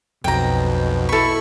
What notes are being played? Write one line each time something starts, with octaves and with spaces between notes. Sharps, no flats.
B1 F2 B2 G5 A#5
E4 A4 B5 C#6